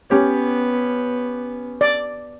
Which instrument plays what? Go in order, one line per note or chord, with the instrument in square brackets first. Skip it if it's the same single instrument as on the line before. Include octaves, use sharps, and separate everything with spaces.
[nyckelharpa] B3 [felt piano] C#4 G4 C#5
[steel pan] D5